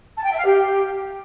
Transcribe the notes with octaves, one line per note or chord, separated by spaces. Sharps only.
A5
G5
E5
F5
G4